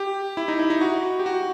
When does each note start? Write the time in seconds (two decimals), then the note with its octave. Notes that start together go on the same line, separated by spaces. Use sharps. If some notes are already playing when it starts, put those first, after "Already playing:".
Already playing: G4
0.37 E4
0.48 D#4
0.59 E4
0.70 D#4
0.81 F#4
1.19 G4
1.26 F#4